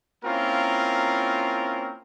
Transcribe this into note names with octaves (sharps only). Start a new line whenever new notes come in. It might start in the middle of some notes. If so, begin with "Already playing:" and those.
A#3 C4 C#4 E4 F4 A#4